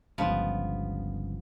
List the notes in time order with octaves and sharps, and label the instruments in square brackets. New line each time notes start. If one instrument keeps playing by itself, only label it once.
[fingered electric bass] G1 C#2 [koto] F3 B3